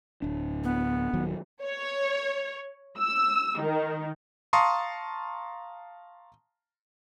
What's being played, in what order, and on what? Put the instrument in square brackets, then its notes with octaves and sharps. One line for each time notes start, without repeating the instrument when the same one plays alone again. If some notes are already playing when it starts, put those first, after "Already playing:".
[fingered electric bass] D1 D4
[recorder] B3
[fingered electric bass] D#1 D#3 F#3
[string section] C#5
E6
D#3
[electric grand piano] F5 A5 A#5 C6 C#6 D#6